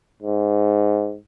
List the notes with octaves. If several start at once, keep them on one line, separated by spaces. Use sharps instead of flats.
G#2